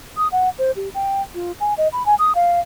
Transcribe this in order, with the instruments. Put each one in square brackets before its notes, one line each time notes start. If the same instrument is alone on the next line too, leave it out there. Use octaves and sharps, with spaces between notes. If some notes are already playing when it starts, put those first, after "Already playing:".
[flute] D#6
F#5
C5
G4
G5
F4
G#5
D#5
B5
G#5
D#6
F5